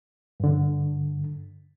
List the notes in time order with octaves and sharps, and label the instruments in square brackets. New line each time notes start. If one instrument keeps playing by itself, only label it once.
[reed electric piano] G2 D3